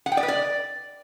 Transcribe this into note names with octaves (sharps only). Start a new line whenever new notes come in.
F#5
G5
D5
B4
D5